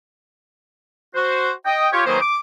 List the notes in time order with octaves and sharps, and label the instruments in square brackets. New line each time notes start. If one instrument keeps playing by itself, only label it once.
[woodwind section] F#4 C5
D#5 G5
F4 G4 C#5
D#3 F#3 A#3 G#4 B4 C5
D6